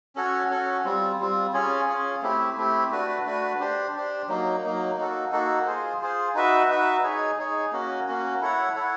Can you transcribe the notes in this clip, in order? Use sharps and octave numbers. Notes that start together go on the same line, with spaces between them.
C#4 F#4 A4 C#5
C#4 F#4 A4 C#5
G3 C4 F4
G3 C4 F4
C#4 F4 G#4 C#5
C#4 F4 G#4 C#5
A3 C4 E4 G4
A3 C4 E4 G4
A3 D4 F#4 B4
A3 D4 F#4 B4
D4 G4 C5
D4 G4 C5
F#3 A#3 D#4
F#3 A#3 D#4
A#3 D#4 F#4 A4
A#3 D#4 F#4 A4
F4 G#4 C5
F4 G#4 C5
D#4 F#4 B4 E5
D#4 F#4 B4 E5
D#4 G#4 C#5
D#4 G#4 C#5
A#3 C#4 F#4
A#3 C#4 F#4
E4 A4 C#5 F#5
E4 A4 C#5 F#5